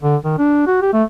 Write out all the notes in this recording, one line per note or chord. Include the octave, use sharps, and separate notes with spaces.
D3
D#3
D4
F#4
G4
A3